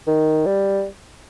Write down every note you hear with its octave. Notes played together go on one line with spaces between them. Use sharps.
D#3
G3